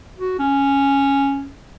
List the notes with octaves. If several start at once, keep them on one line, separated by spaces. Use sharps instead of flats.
F#4
C#4